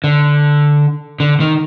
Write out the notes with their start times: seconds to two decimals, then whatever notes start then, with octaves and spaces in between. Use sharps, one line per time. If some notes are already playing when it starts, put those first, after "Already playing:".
0.04 D3
1.20 D3
1.40 D#3